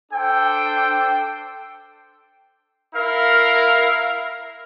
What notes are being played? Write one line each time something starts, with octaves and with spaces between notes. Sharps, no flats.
D4 A4 C5 G5
E4 A#4 F5